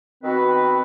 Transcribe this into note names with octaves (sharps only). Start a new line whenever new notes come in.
D#3 B3 C4 F#4 B4